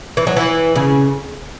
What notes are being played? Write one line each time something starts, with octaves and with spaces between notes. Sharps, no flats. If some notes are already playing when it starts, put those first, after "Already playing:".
E3
F#3
E3
C#3